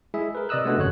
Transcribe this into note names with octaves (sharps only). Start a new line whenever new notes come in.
G#3 E4 G#4 E5
A#4 B4
C3 D5 D#5 D#6 E6 F#6
G#3 A3 B3 D4 F#4 A4
G1 F2 C#3 C#5 F#6